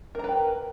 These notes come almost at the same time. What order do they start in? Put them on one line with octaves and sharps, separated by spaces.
A#4 A#5 B4 G5